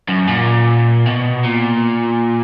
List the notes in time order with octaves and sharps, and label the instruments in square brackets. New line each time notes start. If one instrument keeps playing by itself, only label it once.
[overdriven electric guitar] F#2
A#2
B2
A#2